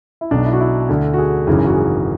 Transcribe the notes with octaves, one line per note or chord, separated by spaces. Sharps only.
E4
B1 B2 D4
E4
F#4
E4
D2 D3
F#4
G#4
G#1 F#2 C#3 E3
F#4
G#4